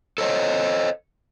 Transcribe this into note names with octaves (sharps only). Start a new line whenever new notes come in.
A4 C5 C#5 D#5